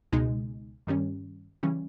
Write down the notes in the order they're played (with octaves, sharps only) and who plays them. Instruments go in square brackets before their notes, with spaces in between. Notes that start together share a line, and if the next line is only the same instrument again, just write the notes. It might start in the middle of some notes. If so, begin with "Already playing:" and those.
[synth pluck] C#2 B2 G#3 D#4
G2 D#3 G3 C#4
C#3 E3 G3 C#4